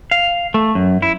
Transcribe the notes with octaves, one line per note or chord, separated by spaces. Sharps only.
F5
A3
F#2
E4